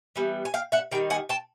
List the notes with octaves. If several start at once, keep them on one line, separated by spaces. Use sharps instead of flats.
E3 G3 B3
G#5
F5 G5
E5 F#5
D#3 G3 D#4 G5
F#5 G#5
G5 A5